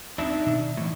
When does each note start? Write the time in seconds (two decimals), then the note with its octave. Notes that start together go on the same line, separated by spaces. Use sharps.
0.18 D2 G#3 C4 D4 D#4 E5
0.46 B2 D#3
0.77 A2 E3